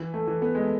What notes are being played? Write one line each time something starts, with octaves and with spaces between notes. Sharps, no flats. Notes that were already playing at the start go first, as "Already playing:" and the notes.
Already playing: E3
A3
E3
B3
G#3
A3